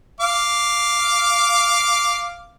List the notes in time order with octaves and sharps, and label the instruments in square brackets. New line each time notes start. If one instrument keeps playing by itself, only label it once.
[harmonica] F5 D6